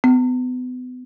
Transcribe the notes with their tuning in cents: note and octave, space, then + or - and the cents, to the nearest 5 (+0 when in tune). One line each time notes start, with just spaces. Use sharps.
B3 +30